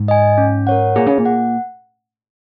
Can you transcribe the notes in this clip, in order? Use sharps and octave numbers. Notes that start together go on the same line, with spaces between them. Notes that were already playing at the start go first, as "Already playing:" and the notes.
Already playing: G#2
D#5 G#5
C#4
A#4 C#5 F#5
A#2 G#4
C#3
A#2
F#5